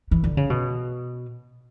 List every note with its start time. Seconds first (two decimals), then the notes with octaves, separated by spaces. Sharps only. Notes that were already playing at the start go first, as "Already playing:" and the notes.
0.11 E3
0.24 D3
0.37 C#3
0.50 B2